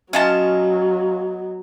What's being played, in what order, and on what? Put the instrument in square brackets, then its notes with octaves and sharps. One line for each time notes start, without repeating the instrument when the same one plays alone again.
[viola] F#3 [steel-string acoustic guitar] B3 D#5 [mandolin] C#4 F4 A5